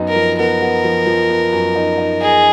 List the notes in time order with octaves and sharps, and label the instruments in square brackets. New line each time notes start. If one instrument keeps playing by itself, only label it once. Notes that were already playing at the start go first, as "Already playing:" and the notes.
Already playing: [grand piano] F#2 B3 D#4
[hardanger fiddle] A#4
[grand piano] F3
[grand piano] B3 [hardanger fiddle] A#4
[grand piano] B3
F3
F3
B3
F#2
D#4
D#4
[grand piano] D#4 [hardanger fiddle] G#4